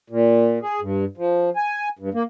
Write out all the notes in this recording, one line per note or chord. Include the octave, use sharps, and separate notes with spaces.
A#2
G#4
G2
F3
G#5
G2
A#3